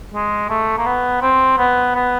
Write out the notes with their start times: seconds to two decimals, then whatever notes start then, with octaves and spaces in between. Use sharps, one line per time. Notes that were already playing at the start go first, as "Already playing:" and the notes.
0.14 G#3
0.50 A3
0.78 A#3
0.86 B3
1.22 C4
1.58 B3
1.95 B3